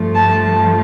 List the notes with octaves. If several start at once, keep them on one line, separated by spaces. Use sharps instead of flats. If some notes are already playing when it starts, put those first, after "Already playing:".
Already playing: G2 F3 A3
A5